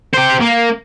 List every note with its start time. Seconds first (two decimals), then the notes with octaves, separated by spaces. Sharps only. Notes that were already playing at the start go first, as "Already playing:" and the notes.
0.14 G4 C5
0.41 A#3